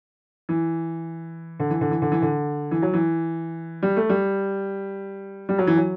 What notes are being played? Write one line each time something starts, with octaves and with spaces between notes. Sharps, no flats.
E3
D3
E3
D3
E3
D3
E3
D3
E3
F#3
E3
G3
A3
G3
G3
F#3
E3
F#3